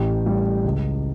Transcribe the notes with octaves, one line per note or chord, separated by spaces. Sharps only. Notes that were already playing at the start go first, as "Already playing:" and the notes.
Already playing: A1 G4 G5
A2 G3
C#2